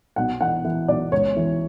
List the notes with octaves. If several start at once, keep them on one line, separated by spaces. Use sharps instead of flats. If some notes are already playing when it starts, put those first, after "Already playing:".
B1 F#5
E3 F#5
E3
B1 D5
C#2 C#5
E3